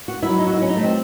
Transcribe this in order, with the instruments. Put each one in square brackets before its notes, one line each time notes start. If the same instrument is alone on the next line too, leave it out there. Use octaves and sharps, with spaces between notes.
[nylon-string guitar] F#4
[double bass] F#3 [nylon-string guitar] E4
[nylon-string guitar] D#4
F#4
E4
C#4
D#4
A3
C4